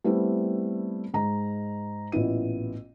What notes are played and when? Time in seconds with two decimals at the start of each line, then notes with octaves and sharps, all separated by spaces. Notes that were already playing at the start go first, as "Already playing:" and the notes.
0.04 G3 A3 B3 C4 E4 G4
1.14 G#2 G#3 A#5
2.12 A1 A#2 B3 E4 D#7